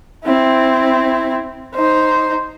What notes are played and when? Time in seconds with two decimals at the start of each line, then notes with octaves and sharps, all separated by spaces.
0.24 C4 E4
1.74 D#4 C5